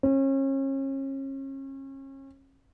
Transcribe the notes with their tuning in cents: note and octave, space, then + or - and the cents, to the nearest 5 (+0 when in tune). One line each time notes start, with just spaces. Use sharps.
C#4 -35